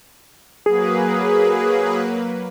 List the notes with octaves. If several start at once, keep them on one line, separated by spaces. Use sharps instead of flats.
F#3 A#3 G#4 B4